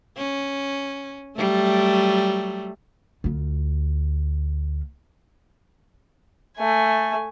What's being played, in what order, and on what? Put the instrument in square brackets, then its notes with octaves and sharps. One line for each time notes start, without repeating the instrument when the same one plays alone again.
[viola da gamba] C#4
F#3 G3 A3
[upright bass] D2 F4
[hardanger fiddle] A3 G#5